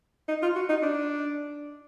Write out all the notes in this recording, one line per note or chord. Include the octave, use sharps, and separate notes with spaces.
D#4
F4
F#4
D#4
D4